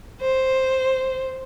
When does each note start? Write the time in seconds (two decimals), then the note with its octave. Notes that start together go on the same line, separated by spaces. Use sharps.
0.21 C5